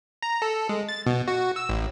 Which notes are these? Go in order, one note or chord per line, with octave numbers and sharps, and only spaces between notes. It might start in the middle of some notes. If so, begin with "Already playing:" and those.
A#5
A4
G#3
A6
B2
F#4
E6
A1